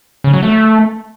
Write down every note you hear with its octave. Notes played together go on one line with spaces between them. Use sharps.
C#3
F#3
A3